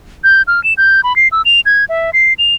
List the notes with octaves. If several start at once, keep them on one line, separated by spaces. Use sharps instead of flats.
G6
F6
E7
G6
B5
C7
E6
F7
G#6
E5
C7
F7